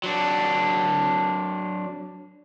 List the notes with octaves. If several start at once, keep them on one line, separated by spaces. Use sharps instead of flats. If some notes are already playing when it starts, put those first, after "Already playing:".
F#3 D4